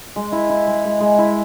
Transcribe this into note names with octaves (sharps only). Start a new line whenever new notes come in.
G#3
E4
E4
G#3
G#3
G#3
E4